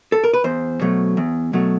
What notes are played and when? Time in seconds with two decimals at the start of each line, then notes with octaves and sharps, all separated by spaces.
0.12 A4
0.24 A#4
0.33 B4
0.44 E2 C5
0.81 B2 F#3 A3
1.17 E2
1.53 B2 F#3 A3